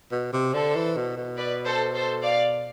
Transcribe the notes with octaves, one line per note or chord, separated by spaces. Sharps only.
B2
C3
D3 A4 C5
E3
B2
B2
B4 D5
A4 C5
A4 C5
D5 F5